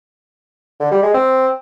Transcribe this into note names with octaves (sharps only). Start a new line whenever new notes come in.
D3
G3
G#3
C4